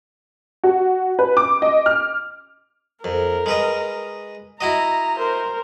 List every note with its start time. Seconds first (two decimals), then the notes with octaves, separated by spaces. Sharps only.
0.64 F#4
1.19 B4
1.37 D6
1.62 D#5
1.86 F6
3.04 F2 A#4
3.46 G#3 B4 D#5
4.61 E4 F#4 D#5 A#5
5.17 A#4 C5